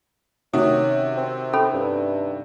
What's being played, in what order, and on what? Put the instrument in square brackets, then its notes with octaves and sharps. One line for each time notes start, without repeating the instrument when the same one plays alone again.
[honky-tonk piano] C3 D#3 F#4 [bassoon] C#4 [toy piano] D#6
[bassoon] C4
[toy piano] C#4 A4 B5
[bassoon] G2